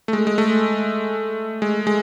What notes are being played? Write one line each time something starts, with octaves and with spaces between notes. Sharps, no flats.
A3
G#3
G#3
A3
G#3
G#3